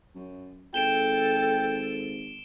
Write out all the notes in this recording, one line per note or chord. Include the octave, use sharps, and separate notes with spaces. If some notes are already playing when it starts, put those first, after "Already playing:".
F#2
G#1 A4 G5 D7 E7 G7